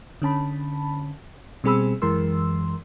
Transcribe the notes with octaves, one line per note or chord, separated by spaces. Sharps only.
D3 C#4 A5 B5
B2 G3 C4 G#4 B5 E6
F#2 E3 G#3 A#4 C6 E6